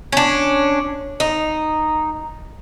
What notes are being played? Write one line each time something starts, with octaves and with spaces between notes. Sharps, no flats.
C#4 D4
D#4